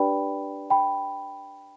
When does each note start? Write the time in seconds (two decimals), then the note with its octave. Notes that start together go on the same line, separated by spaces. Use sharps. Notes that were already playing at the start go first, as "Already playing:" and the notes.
Already playing: D4 G4 B4 D5 G5 B5
0.70 G5 B5